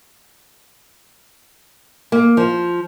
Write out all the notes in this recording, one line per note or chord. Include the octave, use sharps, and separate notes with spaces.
A#3
F3